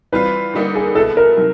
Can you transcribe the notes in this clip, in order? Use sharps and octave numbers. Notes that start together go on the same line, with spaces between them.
E3 G3 C4 F4 B4
D3 G3 A#3 D#4 G4
G#4
B2 G#3 B3 E4 A4
A#4
C3 D#3 F#3